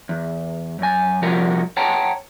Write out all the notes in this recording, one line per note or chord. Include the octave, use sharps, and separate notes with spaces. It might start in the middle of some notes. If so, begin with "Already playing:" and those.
E2
F#2 G#5
C2 F3 G3 F#4 A#4
C#5 F#5 G5 A5 A#5